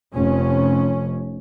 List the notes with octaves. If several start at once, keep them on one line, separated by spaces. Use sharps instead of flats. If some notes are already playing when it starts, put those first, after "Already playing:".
F1 C#4